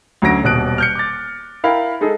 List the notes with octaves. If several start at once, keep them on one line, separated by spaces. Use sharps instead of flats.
D2 F#3 C#4 A#6 D7
D#1 B2 D#6 F#6 D7
F6 G6 C#7
D6 A6
E4 A#4 F5 G5 B5
G#3 D#4 G#4 A4